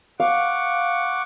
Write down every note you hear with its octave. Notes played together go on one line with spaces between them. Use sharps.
F5 F#5 C#6 D6